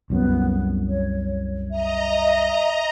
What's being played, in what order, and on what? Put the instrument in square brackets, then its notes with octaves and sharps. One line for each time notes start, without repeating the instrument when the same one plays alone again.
[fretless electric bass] C2 F#2 [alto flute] B3
[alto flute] C#5
[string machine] D#5 A#5 [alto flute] E5